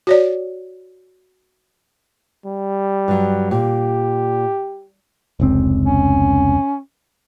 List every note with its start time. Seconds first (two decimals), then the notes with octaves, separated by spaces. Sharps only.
0.07 F#4 C#5 D5
2.45 G3
3.08 G2 F#3
3.51 A#2 G4
5.40 F1 C#2 C4
5.85 C#4